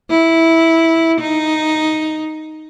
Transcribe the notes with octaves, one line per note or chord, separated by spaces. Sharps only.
E4
D#4